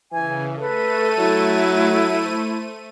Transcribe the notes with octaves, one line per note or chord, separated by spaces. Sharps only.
C#3 E3 G#5
A3 A4 B4 D#7
F#3 E4
C5